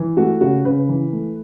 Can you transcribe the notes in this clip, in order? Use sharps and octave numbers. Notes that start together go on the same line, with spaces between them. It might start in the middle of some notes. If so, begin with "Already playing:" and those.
Already playing: E3
A3 F#4
C#3 F#4
C#3 B4
E3
A3